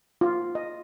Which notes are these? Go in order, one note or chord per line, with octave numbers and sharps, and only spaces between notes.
F4
D#5